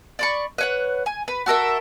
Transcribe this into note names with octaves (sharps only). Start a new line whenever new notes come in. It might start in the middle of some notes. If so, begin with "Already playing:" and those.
D5 B5 C#6
B4 C#5 F#5
G#5
B4
F#4 A4 A#4 E5